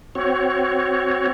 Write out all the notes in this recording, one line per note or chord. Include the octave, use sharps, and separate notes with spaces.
C4 F#4 C#5